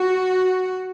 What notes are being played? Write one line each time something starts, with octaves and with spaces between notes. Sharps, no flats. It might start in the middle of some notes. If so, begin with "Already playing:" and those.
Already playing: F#4